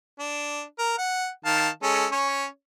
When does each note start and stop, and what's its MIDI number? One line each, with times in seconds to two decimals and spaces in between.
0.19 0.62 62
0.79 0.93 70
0.98 1.28 78
1.45 1.69 51
1.45 1.69 77
1.45 1.69 81
1.83 2.06 56
1.83 2.06 61
1.83 2.06 69
2.12 2.45 61
2.12 2.45 73